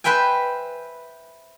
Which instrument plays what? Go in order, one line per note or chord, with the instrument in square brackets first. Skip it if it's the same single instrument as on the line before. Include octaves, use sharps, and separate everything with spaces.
[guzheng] B4 C5 E5 G5 G#5